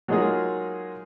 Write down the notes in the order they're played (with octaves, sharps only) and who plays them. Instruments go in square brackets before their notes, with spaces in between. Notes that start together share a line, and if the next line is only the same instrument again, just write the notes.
[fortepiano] F#3 G#3 A#3 D#4 F4 G#4